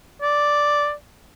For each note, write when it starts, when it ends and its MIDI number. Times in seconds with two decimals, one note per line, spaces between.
0.22 0.92 74